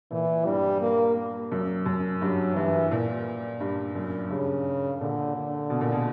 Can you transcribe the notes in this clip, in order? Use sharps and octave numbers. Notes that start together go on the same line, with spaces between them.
A#2 E3
G2 G3
A#3
A#3
F#2
F#2
G2 F#3
G2 E3
A#2
G2
F#2
G2 C#3
A#2 D3
D3
B2
A#2
B2